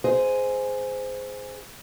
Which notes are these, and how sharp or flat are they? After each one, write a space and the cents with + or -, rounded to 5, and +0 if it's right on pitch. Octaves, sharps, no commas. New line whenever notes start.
G#4 +0 C5 -15 D#5 +0